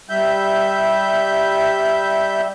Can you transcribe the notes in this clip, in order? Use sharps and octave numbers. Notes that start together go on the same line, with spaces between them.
G3 E5 G6